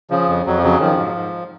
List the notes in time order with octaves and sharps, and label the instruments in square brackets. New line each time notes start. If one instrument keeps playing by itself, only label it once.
[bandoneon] C#3 F3
F2
F2 F#3
F3
C#3 F#3
D#3 F3
G#2
G#2